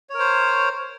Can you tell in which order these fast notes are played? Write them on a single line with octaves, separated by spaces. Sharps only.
C#5 A#4 C5